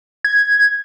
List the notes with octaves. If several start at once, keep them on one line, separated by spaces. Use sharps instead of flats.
G#6